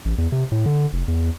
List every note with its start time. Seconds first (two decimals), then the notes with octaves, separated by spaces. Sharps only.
0.05 A1
0.18 E2
0.32 C3
0.52 A2
0.66 D3
0.93 F1
1.08 E2